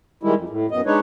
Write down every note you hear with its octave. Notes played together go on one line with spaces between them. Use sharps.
D#3 G3 G#3 E4
F2
A2
F#2 B2 D#5
G#3 D4 D#4 B4 C#5